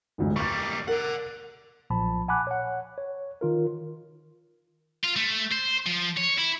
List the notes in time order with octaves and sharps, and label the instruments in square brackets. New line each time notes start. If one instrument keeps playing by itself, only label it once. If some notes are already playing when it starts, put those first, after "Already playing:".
[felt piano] A1 D2 G#2
[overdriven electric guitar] G3 A#3 [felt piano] C#6 A6
[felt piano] A#4 [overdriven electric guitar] D5 F#5
[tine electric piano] B1 A#2 F3 A5 B5
F#5 G#5 A5 B5 D6 F#6
C#5 F#5
C#5
D#3 F4 A#4
[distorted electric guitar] F4
A3
C5
F3
C#5
E4